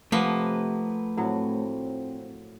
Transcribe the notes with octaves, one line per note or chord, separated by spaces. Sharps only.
C3 F3 A3 A#3 B4 F#5
A2 F#3 C4